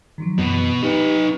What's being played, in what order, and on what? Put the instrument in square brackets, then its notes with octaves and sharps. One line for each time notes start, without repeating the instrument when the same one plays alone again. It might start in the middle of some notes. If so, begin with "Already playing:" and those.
[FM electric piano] D#3 F3 F#3
[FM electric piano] F#2 E3 B5 [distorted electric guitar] B2
[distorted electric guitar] D#4 B4 [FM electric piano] G4